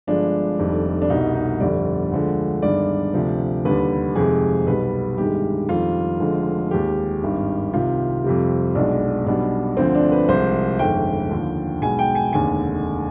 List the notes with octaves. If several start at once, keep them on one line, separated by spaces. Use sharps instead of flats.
G1 G2 F3 G#3 D4
F1 F2 D#3 G3
D4
C2 B2 G3 D#4
D#4
G1 F2 D3 G3 D5
D2 D3 F3 G#3
G1 G2 D#3 G#3 D5
D2 C3 F3
D#2 D3 G3 B4
F2 C3 D#3 G#3 G#4
B1 B2 G3 B4
G1 G2 D#3 G#3 G4
F2 D#3 G3 F4
F1 F2 D3 G#3
D#2 D#3 G#3 G4
G#1 G2 D#3
C2 C3 D#3 F4
F2 C3 G3
B1 B2 G#3 D4
B1 B2 G3 D4
D2 D3 F3 C4
D4
B4
C2 C3 F3 G#3 C5
G1 F2 D#3 G#3 G5
D#2 D3 F3
B1 B2 G#3 G#5
G5
G#5
F1 D#2 D3 G#3 G#5